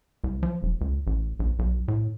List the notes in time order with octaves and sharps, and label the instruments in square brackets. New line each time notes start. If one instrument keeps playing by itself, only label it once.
[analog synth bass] C2
F3
E1
C#2
A1
A#1
B1
A2